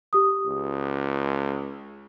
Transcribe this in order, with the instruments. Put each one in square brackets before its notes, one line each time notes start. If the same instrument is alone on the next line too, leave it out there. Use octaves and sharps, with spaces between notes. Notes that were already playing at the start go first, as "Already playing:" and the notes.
[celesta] G4 D#6
[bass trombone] C#2